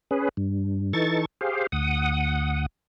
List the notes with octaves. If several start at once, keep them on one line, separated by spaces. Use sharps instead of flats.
C#4 G#4 B4
G2
E3 D#4 A4 C#6 A6
G4 G#4 C5 F5
D2 F#5 D#6